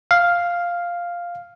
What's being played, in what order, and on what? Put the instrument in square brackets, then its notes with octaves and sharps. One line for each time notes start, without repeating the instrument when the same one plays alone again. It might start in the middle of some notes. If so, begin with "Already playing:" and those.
[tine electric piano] F5